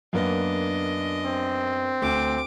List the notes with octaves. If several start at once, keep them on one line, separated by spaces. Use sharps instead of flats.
F#2 A#3 B3 D4 D#5
C4
D2 D6